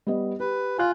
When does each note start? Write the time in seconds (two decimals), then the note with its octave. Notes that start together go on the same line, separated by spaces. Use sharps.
0.06 G3 B3 D#5
0.40 G4 B4
0.78 F4 G#5 F#6